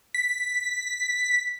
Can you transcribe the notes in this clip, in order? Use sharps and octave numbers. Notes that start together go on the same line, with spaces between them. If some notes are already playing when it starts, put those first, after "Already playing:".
B6